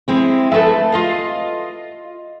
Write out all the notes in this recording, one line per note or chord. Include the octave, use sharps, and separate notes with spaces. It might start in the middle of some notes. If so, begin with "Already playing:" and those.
G#3 C4 E4
G#3 A3 A4 B4 E5
F4 D#5 F5